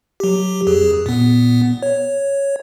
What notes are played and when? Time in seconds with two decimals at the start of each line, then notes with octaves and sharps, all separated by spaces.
0.20 F#3 G4
0.67 F2 G#4
1.06 A#2 B3
1.82 C#5